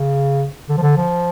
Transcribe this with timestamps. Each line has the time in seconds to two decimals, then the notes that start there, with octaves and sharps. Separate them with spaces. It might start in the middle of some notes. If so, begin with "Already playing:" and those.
Already playing: C#3
0.69 D3
0.78 F3
0.83 D3
0.97 F3